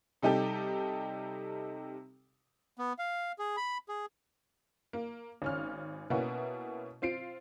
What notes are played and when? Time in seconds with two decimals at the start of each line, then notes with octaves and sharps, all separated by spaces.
0.22 C3 G3 D#4 G4 A4
2.77 B3
2.98 F5
3.39 G#4
3.57 B5
3.89 G#4
4.93 A#3
5.42 G#1 C#4 F6
6.10 B2 A#3 B3 C#4 E4 F#4
7.02 C4 F4 C7 D7